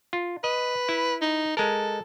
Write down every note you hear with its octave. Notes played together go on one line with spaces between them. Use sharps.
F4
B4 D#5
E4
D#4
G#3 A4 A#4